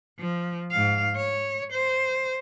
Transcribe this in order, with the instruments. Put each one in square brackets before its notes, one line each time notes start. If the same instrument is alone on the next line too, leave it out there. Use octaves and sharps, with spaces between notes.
[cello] F3
G#2 F5
C#5
C5